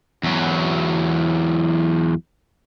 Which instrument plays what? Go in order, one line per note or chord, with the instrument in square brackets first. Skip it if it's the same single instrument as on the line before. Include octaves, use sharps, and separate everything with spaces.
[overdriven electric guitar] E2 F#3